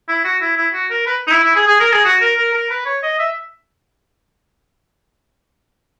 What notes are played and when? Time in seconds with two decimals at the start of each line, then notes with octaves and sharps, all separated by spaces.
0.08 E4
0.25 F#4
0.41 E4
0.57 E4
0.74 F#4
0.90 A#4
1.06 B4
1.27 D#4
1.31 E4
1.43 E4
1.55 G#4
1.68 G#4
1.80 A#4
1.92 G#4
2.05 F#4
2.21 A#4
2.38 A#4
2.54 A#4
2.70 B4
2.86 C#5
3.03 D#5
3.19 E5